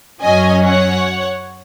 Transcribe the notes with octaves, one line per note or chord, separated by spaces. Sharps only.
F#2 F#3 C#4 D#5 G#5
C#5 F#5